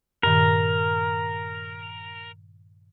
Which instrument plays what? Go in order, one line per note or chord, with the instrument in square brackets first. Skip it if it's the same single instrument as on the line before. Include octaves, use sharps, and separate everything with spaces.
[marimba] G2 A#2 D#3 [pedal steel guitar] A#4